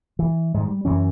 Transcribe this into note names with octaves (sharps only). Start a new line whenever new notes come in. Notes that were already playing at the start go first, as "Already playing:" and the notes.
E3
G#2 D#3
G3
F#2 E3 C#4